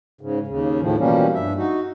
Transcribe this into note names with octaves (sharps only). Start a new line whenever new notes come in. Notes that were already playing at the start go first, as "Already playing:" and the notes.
G#2 C#3
D#2 C#3
A2 D#3 F3
B2 E3 F3 G3 A#3 C#4
G2 E5
D#4 F#4